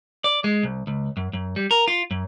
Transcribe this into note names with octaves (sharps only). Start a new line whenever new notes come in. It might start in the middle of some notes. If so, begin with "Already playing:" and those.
D5
G#3
C2
C#2
F#2
F#2
G3
A#4
F4
F#2